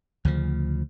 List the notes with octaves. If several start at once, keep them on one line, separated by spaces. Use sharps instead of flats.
D2 C#3 F3